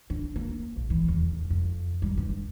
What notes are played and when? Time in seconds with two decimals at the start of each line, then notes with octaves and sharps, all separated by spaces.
0.10 D4
0.36 A#3
0.76 A#1
0.90 E3
1.08 E2
1.31 D3
1.50 F2
2.02 G3
2.17 G2